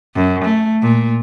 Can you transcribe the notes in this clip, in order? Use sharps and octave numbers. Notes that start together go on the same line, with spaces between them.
F#2
A3
A#2